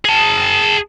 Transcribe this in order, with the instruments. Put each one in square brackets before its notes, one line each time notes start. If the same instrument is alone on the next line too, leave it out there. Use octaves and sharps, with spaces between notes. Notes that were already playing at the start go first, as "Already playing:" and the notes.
[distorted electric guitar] G#4 A5